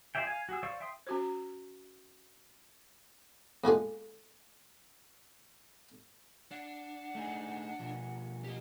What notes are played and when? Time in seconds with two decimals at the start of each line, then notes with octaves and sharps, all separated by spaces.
0.15 F4 G#4 D5 E5 G5
0.27 F5 G#5
0.49 F#4 G#4 E6
0.63 C5 D5 F5 C#6 E6
0.80 E5 G5 C6 D#6
1.07 C#4 F#4 C5
3.64 E2 A#2 D3 G#3
6.51 D4 F#5
7.15 A3 D#4 G#4
7.80 B2 F3
8.44 G4 D#5